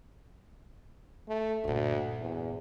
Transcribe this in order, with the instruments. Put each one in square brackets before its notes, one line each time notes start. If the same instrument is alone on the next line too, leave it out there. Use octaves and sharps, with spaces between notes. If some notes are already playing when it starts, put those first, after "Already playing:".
[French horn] A3
[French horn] D2 [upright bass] G2 A#2
[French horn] E2